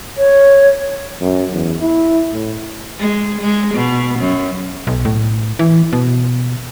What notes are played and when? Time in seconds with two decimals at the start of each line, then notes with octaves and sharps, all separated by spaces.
0.18 C#5
1.21 F#2
1.52 E2
1.81 E4
2.33 A2
2.99 G#3
3.41 G#3
3.74 B2
4.19 F#2
4.87 B1
5.05 A2
5.59 E3
5.93 B2